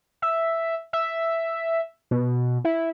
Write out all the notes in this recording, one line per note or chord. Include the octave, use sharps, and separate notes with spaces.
E5
E5
B2
E4